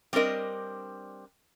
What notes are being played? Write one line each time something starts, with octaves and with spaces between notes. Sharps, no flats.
G3 C4 D4 A#4 D#5